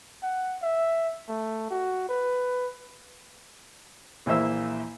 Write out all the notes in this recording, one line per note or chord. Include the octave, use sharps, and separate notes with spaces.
F#5
E5
A3
F#4
B4
A#1 E3 A#3 C5 E5 E6